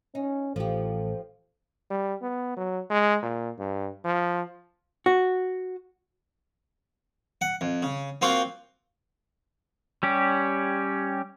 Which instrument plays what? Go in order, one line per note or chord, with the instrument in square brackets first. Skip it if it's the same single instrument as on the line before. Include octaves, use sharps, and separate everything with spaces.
[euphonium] C#4 [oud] D#4
[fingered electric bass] A1 [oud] F3 G4 [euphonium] A4
[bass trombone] G3
B3
F#3
G#3
A#2
G2
F3
[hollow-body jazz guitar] F#4
[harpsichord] F#5
F2
C#3
A#3 C4 F4 F#4 C5 F5
[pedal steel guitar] G3 C#4 G4